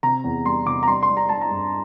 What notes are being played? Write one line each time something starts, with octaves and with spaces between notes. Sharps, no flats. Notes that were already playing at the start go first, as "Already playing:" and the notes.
C3 A#5
E2
G3 C6
C3 D6
A#5
G3 C6
C6
G3
A#5
G3 A5
A#5
G2